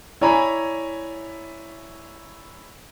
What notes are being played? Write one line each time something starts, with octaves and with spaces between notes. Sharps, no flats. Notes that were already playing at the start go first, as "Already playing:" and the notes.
E4 C#5 D5 G#5 A#5 B5